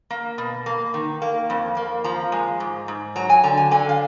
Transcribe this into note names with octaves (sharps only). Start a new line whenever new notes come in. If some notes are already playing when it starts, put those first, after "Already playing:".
A#3
B2
A#3
D#3
A#3
F2
A#3
F3 A#5
G#3
G#2
G#2
F#3 A#5
G#5
D3 A#5
G#5
D3 G#5
F5